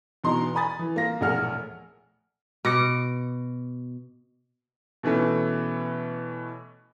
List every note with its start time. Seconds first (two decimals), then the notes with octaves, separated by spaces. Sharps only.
0.24 E2 B2 E3 D#4 A#5 C6
0.55 G#5 B5 D#6 A6
0.79 E3
0.96 A#3 F4 A#6
1.21 E1 A#1 A3 G#4 F#5 F6
2.65 B2 D6 A#6 C#7
5.03 B2 E3 A3 C#4